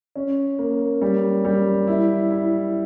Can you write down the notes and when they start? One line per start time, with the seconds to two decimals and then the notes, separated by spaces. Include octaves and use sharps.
0.16 C#4
0.59 A#3
1.01 G3
1.45 G3
1.87 E4
2.31 E4